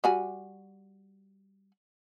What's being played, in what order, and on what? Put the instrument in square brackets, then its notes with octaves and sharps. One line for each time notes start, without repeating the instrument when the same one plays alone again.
[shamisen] G3 F#4 G#5